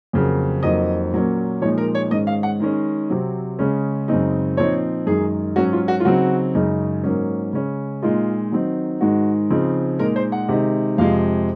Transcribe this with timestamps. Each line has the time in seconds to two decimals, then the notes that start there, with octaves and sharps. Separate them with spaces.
0.13 F2 C#3 F#3 A#3
0.63 F2 D#3 F#3 A#3 D#5
1.12 A#2 F#3 A#3 C#4
1.62 A#2 F3 G#3 D#4 C#5
1.78 A#4
1.95 C#5
2.11 G#2 D#3 G#3 C#4 D#5
2.27 F5
2.43 F#5
2.60 D#3 G#3 C#4
3.10 C3 F#3 C4
3.59 C#3 G#3 C#4
4.08 F#2 C#3 G#3 C4 D#4
4.57 A#2 F3 C4 D#4 C#5
5.06 F#2 D#3 G#3 G#4
5.56 G#2 F#3 C#4 F#4
5.73 F4
5.88 F#4
6.00 F4
6.05 C#3 F#3 C4 D#4 F#4
6.54 F#2 C#3 G#3 D#4
7.03 G#2 F#3 A#3 C#4
7.53 C#3 G#3 C#4
8.02 A#2 G#3 D#4 F4
8.52 D#3 F#3 C4 D#4
9.01 G#2 D#3 G#3 F#4
9.50 C#3 F3 C4 D#4
9.99 A#2 G#3 D#4 A#4
10.16 C5
10.32 F#5
10.49 C3 D#3 G#3 D#4
10.98 F2 C3 F3 G#3 F5